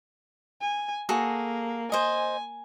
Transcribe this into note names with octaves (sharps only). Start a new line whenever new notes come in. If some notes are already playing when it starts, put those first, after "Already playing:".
G#5
A#3 F#4 G#4 A4
C5 D#5 G#5